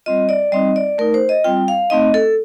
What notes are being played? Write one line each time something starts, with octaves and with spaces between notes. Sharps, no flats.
G3 C4 F4 D#5
D5
G3 C4 D#4 D#5
D5
A3 D#4 A#4
C5
D#5
G3 C4 F4 G5
F5
A3 C4 D#4 D#5
A4